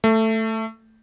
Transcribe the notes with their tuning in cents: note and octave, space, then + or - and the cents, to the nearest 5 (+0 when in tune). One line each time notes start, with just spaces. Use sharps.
A3 +10